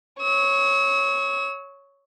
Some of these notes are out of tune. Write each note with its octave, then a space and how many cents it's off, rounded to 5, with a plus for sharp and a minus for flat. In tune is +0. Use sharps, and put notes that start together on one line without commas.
C#5 +0 E6 -45